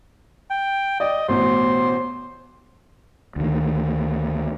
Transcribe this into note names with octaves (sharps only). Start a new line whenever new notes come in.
G5
D5 D#5
A1 B2 C5
D2 D#3